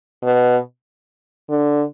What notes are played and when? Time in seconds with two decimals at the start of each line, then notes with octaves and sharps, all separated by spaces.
0.23 B2
1.49 D3